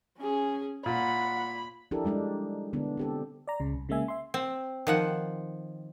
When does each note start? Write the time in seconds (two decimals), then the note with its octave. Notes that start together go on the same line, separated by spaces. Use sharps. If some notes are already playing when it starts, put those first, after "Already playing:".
0.18 C#4 G#4
0.86 A#2 F#5 B5
1.91 F3 D4 E4 G4 A4 A#4
2.05 G3 G#3 D4 D#4
2.73 D3 B3 D4
2.97 C4 G4 A4
3.48 D5 A#5
3.60 C#2 C#3
3.73 C2
3.89 C#3 G#3 A#3 E5 G#5
4.08 E5 C6
4.34 C4
4.87 D#3 F3 F#5